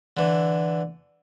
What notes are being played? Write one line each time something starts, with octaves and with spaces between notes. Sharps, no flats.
D3 E3